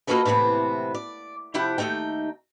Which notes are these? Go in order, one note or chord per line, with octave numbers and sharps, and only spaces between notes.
A#3 F4 F#4 A4 B4 D#5
A2 C3 E3 B3 C4
D5
C3 F3 E4 G4 F#5 G5
D#2 D3 A3 D#4 G5